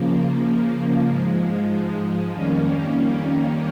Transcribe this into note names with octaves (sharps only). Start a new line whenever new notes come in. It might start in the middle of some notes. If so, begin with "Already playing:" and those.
Already playing: C#3 F3 A#3
G#2 F3 G#3
F2 D#3 G3 A#3 C#4